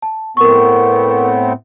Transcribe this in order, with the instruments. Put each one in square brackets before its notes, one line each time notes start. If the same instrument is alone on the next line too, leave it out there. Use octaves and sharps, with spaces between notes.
[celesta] A5
[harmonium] A2 B3 C4 [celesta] A#4 C#6